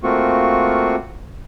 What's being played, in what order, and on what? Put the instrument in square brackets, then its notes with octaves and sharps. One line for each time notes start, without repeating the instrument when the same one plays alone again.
[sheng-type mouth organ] A3 A#3 C4 F4 F#4 C#6